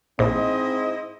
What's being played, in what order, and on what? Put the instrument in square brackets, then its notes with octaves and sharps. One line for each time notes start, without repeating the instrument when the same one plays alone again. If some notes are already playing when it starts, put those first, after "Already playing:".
[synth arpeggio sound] A#1 [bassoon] G#2 [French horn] C4 [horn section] E4 C5 D#5